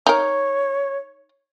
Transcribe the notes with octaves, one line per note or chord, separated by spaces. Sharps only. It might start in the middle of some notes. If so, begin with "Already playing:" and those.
D#4 A#4 C#5